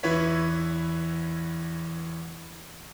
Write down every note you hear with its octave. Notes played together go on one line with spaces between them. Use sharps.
E2 E3 E4 B4 C#5 B6